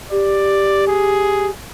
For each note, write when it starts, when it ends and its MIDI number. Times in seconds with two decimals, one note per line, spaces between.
0.11 1.50 67
0.11 0.86 74
0.88 1.51 68